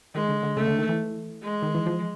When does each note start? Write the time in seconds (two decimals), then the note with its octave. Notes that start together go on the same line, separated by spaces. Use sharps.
0.15 D#3 G#3
0.29 D3
0.43 D3
0.57 C#3 A3
0.67 D3
0.79 D#3
0.89 E3
1.43 G#3
1.62 D#3
1.75 E3
1.86 F3